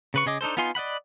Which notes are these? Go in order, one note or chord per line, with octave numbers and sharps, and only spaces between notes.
C#3 B4 C#6
C#3 G#4 D#5 D6
D4 D#4 A4 C5
B3 D#4 F4 G#5 C6
D5 D#5 F#5 B5